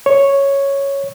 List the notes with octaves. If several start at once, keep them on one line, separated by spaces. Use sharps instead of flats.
C#5